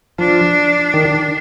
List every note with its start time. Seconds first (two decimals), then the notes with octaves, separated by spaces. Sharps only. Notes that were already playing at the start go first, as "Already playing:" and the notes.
0.18 F3 D4
0.94 D#3